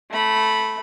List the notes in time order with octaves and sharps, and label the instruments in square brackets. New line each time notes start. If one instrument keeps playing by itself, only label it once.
[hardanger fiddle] A3 B5